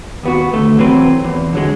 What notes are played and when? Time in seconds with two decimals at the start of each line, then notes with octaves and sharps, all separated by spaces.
0.23 D#2 B3 F#4
0.54 D2 A3
0.78 E3 F#3 C4 B4
1.24 E2
1.53 D3 F#3 G#3